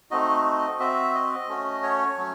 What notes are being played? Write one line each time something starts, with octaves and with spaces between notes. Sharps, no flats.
A3 C4 D#4 F#4 D#5
C4 F#4 E5
D#5
A3 C#4 F#4
C#5
F#3 A3 C#4